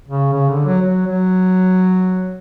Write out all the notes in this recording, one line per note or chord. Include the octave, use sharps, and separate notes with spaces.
C#3
C#3
D3
F#3
F#3
F#3